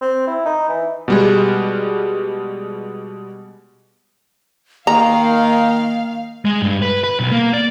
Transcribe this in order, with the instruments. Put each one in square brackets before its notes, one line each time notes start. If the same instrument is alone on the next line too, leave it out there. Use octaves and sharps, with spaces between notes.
[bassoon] C4
E4
D#4
E3
[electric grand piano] B2 G3 G#3
[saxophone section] D#3 [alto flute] A#3 [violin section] F5 [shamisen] A#5
[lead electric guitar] G#3
G2
B4
B4
B1
A#3
D5